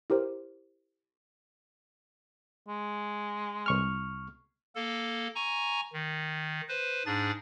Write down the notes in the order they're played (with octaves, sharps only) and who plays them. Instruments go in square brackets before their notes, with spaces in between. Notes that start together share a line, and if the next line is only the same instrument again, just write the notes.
[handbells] E4 G4 A#4 C5
[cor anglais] G#3
[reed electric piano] C2 C#6 F6
[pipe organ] A#3 A4
G#5 A#5 C#6
D#3
B4 C5
G#2 D4 G#4 A6